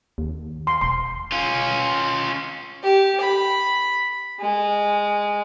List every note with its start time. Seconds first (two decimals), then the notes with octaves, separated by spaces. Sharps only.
0.18 D#2
0.67 C6
0.81 E1 C6
1.32 C#4 F4
2.83 G4
3.21 B5
4.41 G#3